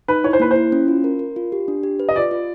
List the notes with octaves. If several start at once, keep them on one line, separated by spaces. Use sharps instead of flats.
D#4 B4
E4 C#5
C5
A#3 B4
E4 C5
C#4
F4
A#4
A#4
F4
G4
D4
G4
B4
D#5
F4 D5
F4